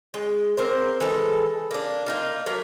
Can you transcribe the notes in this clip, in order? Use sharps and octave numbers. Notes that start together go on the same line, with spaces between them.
G#3
A#3 C4 A#4 C5
E3 G#3 A4
A#3 D4
A#3 D#4 F4
F#3 A3 A#3